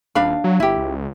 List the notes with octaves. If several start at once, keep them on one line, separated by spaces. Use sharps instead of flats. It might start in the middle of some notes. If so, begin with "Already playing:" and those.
D#1 D4 F5 B5
F#3
G1 E4 G4
C#2